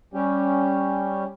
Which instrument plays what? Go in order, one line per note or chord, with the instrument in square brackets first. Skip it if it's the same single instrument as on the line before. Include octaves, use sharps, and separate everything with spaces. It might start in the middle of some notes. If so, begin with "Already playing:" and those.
[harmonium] G3 C#4 G4